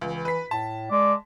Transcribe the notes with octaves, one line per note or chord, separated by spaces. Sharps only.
C#2 E3
B4 B6
A2 A5
G#3 D5